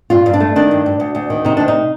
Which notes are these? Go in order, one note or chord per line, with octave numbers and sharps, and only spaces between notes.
G2 F4
G2
D4
A3
D#3 D4
G2
G2
D2
D2
D#3
C3 D#4
D2 D4
D#4